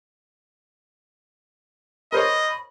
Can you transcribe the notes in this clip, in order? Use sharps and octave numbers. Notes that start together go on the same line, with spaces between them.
A#4 C5 C#5 D#5 B5